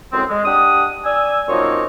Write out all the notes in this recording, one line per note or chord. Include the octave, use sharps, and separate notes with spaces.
F#2 A2 G#3 C4
G#3
D4 G4 F#5 D#6
D5 G#5 E6
F#2 F3 A#3 C4 D#4 C#5